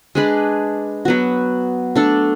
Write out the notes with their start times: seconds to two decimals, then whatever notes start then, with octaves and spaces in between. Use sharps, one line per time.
0.15 G#3 D4 G#4 B4
1.05 F#3 B3 F#4
1.96 A3 D4 A4